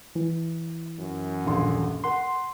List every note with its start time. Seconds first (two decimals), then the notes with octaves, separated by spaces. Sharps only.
0.15 E3
0.99 F#2
1.45 D#1 A#1 C6
2.04 A#4 F#5 C6